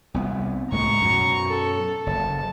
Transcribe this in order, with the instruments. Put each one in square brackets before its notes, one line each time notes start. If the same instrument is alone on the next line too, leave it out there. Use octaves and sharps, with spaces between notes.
[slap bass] C2 B3
[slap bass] C#2 A2 G#3 [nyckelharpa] A#5 C#6
[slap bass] F#2 B2
[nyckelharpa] A4
[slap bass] F#1 [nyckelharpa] A5